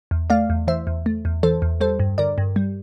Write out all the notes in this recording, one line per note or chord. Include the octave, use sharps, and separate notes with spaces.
E2
A3 D5 F5
E2
E3 C5 E5
E2
A3
E2
E3 A4 C5
E2
G3 A4 C5
G2
D3 A#4 D5
G2
G3